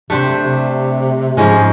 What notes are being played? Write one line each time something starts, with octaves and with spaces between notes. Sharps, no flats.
C3 A3 D4 G4 C5
C3
G#2 F3 G#3 C#4